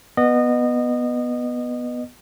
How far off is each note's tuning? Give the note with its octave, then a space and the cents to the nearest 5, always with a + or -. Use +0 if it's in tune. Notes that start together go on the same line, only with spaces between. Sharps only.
B3 -5 D#5 -25